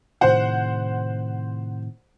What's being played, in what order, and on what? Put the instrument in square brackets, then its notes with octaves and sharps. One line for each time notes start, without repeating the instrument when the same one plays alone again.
[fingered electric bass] A2 C3 D#3 [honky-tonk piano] C5 F#5